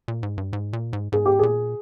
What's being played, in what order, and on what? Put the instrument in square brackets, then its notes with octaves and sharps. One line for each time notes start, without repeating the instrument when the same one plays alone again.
[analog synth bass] A#2
G#2
G2
G#2
A#2
G#2
[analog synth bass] G#2 [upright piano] G#4
[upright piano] G4
[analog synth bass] A#2 [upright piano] G#4